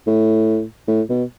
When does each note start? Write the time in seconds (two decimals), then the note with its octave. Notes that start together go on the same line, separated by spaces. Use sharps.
0.07 A2
0.88 A2
1.09 B2